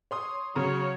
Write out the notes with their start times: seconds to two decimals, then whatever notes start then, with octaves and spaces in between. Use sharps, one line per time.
0.11 C#5 C6 D#6
0.55 C#3 F#3 C#5 A#5